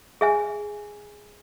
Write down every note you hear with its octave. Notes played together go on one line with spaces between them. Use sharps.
G#4 E5 G#5